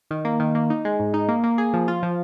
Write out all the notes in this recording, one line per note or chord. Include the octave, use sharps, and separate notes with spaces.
D#3
A#3
D#3
A#3
D#4
G#3
G#2
D#4
A#3
A#3
G#4
F3
F4
F3